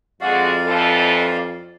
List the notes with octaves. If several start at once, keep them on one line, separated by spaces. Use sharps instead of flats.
F2 G#3 F#4 D5 F5
E3 F3 A4